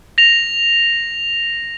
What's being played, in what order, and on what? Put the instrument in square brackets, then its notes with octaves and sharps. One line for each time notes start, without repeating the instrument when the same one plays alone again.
[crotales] A#6 F7